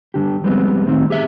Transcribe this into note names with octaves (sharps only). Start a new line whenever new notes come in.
G2 D3 G4
F2 G3 G#3 B3 C4
A2 D#3 C4
G4 G#4 E5